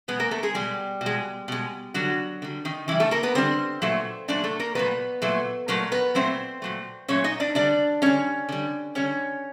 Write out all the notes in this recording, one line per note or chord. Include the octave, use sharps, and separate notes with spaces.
B2 G#3 B3 B4
A#3 A#4
A3 A4
G#3 G#4
B2 G3 G#3 G4
B2
G#3
B2 G#3
D3 F#3 G3 F#4
D3 G3
D#3 D#4
D3 E3 G3 E4
A3 A4
A#3 A#4
B3 B4
D3 G3 C4 C5
A#2 F#3 A3
A#2 F#3 A3 D4 D5
A3 A4
A#3 A#4
A#2 F#3 A3 B3 B4
A#2 F#3 A3
A#2 F#3 A3 A#4
B3 B4
A#2 F#3 A3 C4 C5
A#2 F#3 A3
A#2 F#3 A3 C#4 C#5
D#4 D#5
D4 D5
D3 G3 D4 D5
D3 G3 C#4 C#5
D3 G3
D3 G3 C#4 C#5